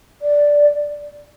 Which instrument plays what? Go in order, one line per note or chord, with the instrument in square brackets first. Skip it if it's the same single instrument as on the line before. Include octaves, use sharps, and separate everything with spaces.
[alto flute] D5